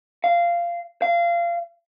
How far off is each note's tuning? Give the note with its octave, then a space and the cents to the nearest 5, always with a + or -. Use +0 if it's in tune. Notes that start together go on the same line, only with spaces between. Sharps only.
F5 -15
F5 -25